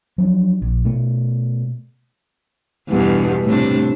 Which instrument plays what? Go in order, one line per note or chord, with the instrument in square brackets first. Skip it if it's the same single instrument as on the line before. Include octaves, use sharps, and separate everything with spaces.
[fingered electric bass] F3 F#3 C#4 D4
A#1
B2 A3
[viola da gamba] E2 G2 B2
A2 C3 D4